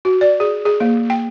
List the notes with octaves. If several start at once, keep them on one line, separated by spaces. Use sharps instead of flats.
F#4
D5
G#4
G#4
A#3
G5